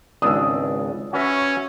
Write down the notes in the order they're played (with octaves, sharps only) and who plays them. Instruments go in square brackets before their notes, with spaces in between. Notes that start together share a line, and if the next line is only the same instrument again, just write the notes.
[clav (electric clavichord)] G#1 C#2 D4 [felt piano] D#6 E6
[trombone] C#4 [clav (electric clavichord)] F#4 B4 E5